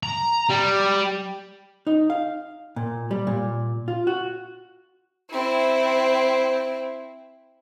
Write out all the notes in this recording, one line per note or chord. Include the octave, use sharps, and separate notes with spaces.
A#5
G3
D#4
F5
A#2
G3
A#2
F4
F#4
C4 E4